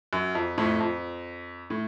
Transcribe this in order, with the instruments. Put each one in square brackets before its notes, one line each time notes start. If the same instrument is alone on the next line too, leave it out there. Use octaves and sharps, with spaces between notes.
[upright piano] F#2
F2
F2 A2
F2
A2